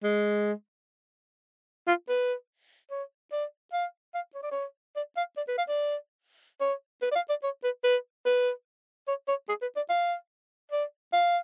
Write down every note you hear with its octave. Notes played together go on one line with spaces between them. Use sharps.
G#3
F4
B4
C#5
D5
F5
F5
C#5
D5
C#5
D5
F5
D5
B4
F5
D5
C#5
B4
D5
F5
D5
C#5
B4
B4
B4
C#5
C#5
G#4
B4
D5
F5
D5
F5